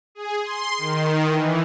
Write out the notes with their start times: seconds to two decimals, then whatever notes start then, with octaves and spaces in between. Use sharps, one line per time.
0.15 G#4
0.43 C6
0.78 D#3
1.26 E3